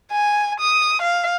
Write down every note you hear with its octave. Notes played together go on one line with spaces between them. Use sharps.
G#5
D#6
F5